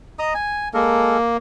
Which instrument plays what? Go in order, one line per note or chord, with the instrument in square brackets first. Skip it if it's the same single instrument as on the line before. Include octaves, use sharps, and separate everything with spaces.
[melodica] D#5 A#5 D#6
G#5
[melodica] G#3 A4 A#4 [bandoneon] A#3